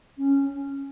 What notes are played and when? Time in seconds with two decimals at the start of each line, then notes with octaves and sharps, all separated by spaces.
0.18 C#4